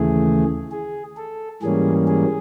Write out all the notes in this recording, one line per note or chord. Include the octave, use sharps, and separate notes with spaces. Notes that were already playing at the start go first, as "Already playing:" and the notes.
Already playing: D#2 C#3 E3 A3 G#4
G#4
A4
G#2 E3 G3 A#3 C#4 G#4
G#4